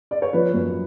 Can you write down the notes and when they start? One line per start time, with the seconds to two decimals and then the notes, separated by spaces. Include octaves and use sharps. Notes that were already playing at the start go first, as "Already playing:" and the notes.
0.11 D5
0.22 C#5
0.33 F3 B4
0.54 F#2